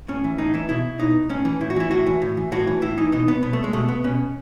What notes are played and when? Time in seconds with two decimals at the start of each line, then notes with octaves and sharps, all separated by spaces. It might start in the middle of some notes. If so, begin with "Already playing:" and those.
0.08 A2 C#4
0.24 E3
0.38 A2 D#4
0.54 E3 E4
0.69 B2 E4
0.99 B2 D#4
1.30 A2 C#4
1.45 E3
1.61 A2 E4
1.70 F#4
1.76 E3 E4
1.91 A2 F#4
2.07 E3
2.22 A2
2.37 E3
2.52 A2 F#4
2.67 E3
2.82 A2 E4
2.98 E3 D#4
3.12 B2 D#4
3.28 B3
3.43 B2 B3
3.53 A3
3.64 G#3
3.73 B2 A3
3.89 B3
4.04 B2 C#4